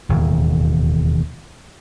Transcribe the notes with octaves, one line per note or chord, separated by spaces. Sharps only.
E1 D#2 A2